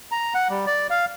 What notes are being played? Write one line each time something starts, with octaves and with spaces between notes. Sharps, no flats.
A#5
F#5
G3
D5
F5